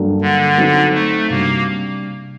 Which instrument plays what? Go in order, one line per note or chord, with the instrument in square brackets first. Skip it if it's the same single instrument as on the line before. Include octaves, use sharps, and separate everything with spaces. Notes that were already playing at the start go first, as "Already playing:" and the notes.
Already playing: [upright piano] G2 F#3 A#3 D4 A4
[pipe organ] D3
[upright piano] F#3 C4 D#4 F#4 A4
[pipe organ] A3
[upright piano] C3 G3 D4 [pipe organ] A#3